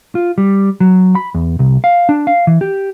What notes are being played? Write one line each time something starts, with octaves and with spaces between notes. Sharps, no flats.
F4
G3
F#3
B5
E2
C2
F5
D4
F5
E3
G4